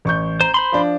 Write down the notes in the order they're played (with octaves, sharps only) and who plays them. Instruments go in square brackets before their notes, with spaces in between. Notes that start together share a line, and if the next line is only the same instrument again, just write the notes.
[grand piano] A1 C#6 G6
[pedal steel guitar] C5 [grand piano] A#5
[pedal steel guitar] C5 B5 C6
[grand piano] F3 D4